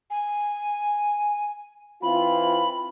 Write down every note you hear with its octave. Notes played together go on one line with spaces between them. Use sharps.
G#5
E3 C4 F4 B5